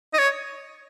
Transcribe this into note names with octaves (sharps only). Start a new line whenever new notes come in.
D#5
C#5